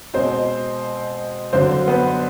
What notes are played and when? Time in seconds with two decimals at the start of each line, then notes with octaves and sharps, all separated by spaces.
0.14 B2 G#3 C4 C5
1.53 G2 D3 F#3 C4 C5
1.88 B3 B4